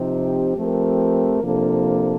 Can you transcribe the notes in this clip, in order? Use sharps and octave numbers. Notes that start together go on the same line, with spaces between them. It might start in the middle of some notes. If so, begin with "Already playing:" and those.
Already playing: C3 F3 C4 D#4 G4
F3 A3 C4 G4 A#4
C3 F3 A#3 D4 A4